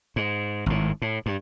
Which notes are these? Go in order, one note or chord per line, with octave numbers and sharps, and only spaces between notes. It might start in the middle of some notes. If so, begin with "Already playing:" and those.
G#2
G#1 A2
A2
G2